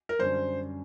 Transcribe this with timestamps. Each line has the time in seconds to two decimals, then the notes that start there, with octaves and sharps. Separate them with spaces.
0.09 A#4
0.19 F#2 D3 G3 C5